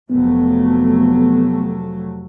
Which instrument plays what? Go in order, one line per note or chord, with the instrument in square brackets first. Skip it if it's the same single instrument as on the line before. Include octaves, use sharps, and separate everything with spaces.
[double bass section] F1 F#3 A3 [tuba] B3